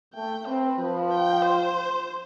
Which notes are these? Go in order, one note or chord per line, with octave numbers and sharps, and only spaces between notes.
A3 G5
C4 B4
F3
G5
C5